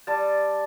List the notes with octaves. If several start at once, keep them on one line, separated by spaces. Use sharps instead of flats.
G3 A5